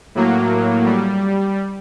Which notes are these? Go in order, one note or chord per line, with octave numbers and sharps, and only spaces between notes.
A2 F#3 A#3
G3